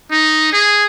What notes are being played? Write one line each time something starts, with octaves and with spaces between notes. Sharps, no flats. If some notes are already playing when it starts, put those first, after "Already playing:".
D#4
G#4